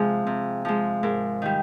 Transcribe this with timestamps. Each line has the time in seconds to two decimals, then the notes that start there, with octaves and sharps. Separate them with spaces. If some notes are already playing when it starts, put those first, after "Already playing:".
Already playing: C3 F3 G#3 G#4
0.27 C3
0.65 F3 G#3
1.03 G#2 A#4
1.42 D#3 G3